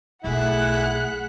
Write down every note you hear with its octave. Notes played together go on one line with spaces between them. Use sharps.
B1 B2 A3 E4 G#4 F#5 F#6